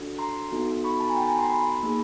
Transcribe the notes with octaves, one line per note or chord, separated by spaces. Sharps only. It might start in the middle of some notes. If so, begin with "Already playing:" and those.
Already playing: D4 F#4 A4
A#5 C6
B3 D#4 F#4 A4
B5 C#6
A5 B5
G#5 A#5
G5 A5
G#5 A#5
A#5 C6
A5 B5
A#3 D#4 G#4